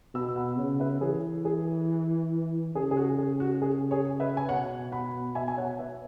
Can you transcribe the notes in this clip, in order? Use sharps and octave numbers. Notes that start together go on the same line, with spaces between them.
B2 B5 E6
F#5 B5
C#3 C#5 F#5
B4 E5
E3 G#4 C#5
G#4
C#3 G#4
G#4
F#4
G#4
F#4
G#4
G#4 C#5
B4 E5
G#5
B2 C#5 F#5
F#5 B5
E5 G#5
G#5
C#5 F#5
B4 E5